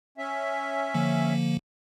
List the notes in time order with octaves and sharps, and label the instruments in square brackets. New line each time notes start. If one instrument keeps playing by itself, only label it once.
[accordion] C#4 E5
[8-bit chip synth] D3 F3 A#3